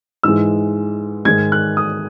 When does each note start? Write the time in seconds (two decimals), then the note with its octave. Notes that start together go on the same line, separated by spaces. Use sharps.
0.23 G#2 E3 G#3 E6
1.25 G#2 D#3 G#3 G#6
1.52 F#6
1.77 D#6